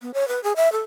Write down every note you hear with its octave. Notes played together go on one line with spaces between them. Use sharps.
B3
C#5
B4
G#4
E5
A4